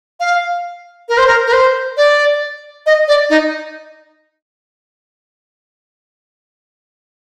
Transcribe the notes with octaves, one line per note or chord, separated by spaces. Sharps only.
F5
A#4
C5
A#4
A#4
C5
D5
D#5
D5
D#4